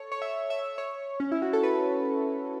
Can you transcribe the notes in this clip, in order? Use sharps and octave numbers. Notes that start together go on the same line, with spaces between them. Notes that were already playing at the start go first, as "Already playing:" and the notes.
Already playing: A4 C#5
C#5
E5
E5
C#5
C#4
E4
F#4
A4
B4